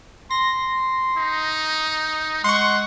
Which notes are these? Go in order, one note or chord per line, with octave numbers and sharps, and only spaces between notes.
C6 A#6
D#4
G#3 F#5 C6 C#6